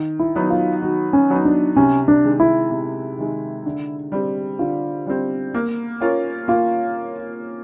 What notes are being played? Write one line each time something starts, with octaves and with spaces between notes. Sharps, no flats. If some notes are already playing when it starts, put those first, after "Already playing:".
Already playing: D#3
E4
F#3 B3 D#4
F4
D#3 F#4
C#4
F#3 B3 D#4
D4
C3 C#4
D4
D#3 G#3
E4
C3
D#3 G#3
D3
G3 C4
D3 F4
G3 C4
A#3
C#4 F4 A#4 C#5
A#3 F4